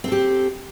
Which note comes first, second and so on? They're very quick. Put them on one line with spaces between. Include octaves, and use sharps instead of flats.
C4 A4 G4